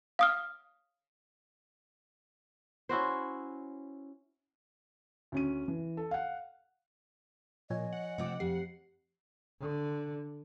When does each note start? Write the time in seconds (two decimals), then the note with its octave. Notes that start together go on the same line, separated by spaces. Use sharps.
0.19 F5 D#6 F6
2.89 C#4 E4 F#4 C5
5.32 D2 C#4 D#7
5.68 E3
5.97 A4
6.11 F5 F#5
7.70 A#2 F3 C#5 D#5 G#5
7.93 F#5
8.18 C3 F3 A3 C4 D6
8.40 F2 G4 C7
9.60 D3